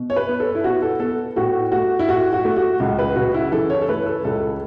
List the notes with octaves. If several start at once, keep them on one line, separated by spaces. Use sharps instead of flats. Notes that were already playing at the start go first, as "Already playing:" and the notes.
Already playing: B2
C#5
B4
B3
A4
E4
B2 F#4
A4
B3 A4
A2 F#4
A3 F#4
E4
A2 F#4
F#4
A3
F#4
C#2
B4
C#3 F#4
E4
E3 A4
C#5
A4
A3 B4
A4
C#2 A4